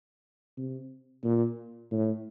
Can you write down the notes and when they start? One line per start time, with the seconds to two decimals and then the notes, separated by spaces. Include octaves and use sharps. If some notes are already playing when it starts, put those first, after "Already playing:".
0.57 C3
1.24 A#2
1.91 A2